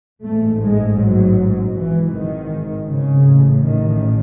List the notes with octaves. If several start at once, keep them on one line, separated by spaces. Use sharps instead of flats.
A1 G#2 A3
G#3
F#3
G#1 G#2 E3
D#3
C#3
A1 A2
D#3